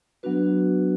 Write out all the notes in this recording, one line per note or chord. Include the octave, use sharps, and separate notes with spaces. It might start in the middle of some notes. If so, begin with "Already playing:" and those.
F#3 B3 D4 F#4 B4